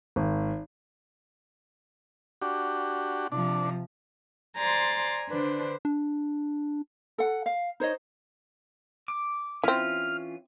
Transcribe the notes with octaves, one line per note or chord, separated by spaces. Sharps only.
G#1
D4 F#4 G4
C3 F3 D4
C5 D5 G#5 A#5 C6 A6
D3 D4 B4 C5
D4
A4 F#5
F5
D#4 C5 C#5 D#5
D6
E3 C4 C#4 E4 F4 F6